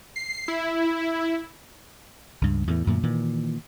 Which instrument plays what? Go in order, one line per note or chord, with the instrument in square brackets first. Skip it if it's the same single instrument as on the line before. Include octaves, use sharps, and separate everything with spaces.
[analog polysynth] C7
E4
[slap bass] C#2 G2
E2 A2 E3
F#2 A#2 D3 A3
A#2 D#3 E3